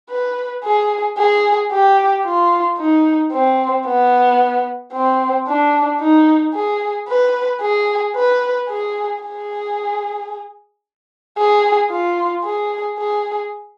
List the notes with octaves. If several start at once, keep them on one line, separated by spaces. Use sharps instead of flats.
B4
G#4
G#4
G4
F4
D#4
C4
B3
C4
D4
D#4
G#4
B4
G#4
B4
G#4
G#4
G#4
F4
G#4
G#4